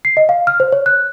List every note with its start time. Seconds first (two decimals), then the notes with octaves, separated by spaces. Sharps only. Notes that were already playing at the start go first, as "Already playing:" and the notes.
0.05 C7
0.17 D#5
0.29 F5
0.47 F6
0.60 C5
0.72 C#5
0.86 F#6